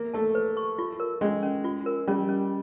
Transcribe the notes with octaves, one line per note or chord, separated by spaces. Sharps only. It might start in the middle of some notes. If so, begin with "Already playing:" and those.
Already playing: A#3 E5
A3 A5
B4
C#6
F4
A#4
G#3 C#4
C#4
F4
A#4
G3 C#4
C#4